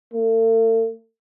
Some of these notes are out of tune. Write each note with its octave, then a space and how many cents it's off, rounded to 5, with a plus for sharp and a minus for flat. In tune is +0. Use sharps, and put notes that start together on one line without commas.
A3 +45